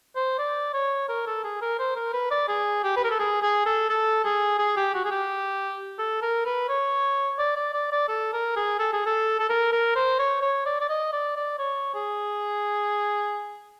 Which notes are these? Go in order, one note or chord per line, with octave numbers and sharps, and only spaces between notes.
C5
D5
C#5
A#4
A4
G#4
A#4
C5
A#4
B4
D5
G#4
G4
B4
A#4
A4
G#4
G#4
A4
A4
G#4
G#4
G4
F#4
G#4
G4
A4
A#4
B4
C#5
D5
D5
D5
D5
A4
A#4
G#4
A4
G#4
A4
A4
A#4
A#4
C5
C#5
C#5
D5
D5
D#5
D5
D5
C#5
G#4